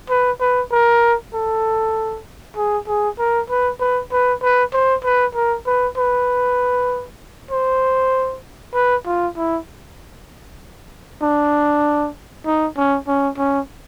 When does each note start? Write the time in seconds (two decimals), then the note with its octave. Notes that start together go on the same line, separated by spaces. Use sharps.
0.10 B4
0.41 B4
0.72 A#4
1.34 A4
2.56 G#4
2.88 G#4
3.19 A#4
3.50 B4
3.80 B4
4.12 B4
4.42 B4
4.73 C5
5.04 B4
5.35 A#4
5.66 B4
5.97 B4
7.51 C5
8.75 B4
9.06 F4
9.37 E4
11.22 D4
12.46 D#4
12.77 C#4
13.08 C#4
13.38 C#4